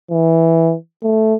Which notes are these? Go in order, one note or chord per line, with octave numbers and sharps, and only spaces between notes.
E3
A3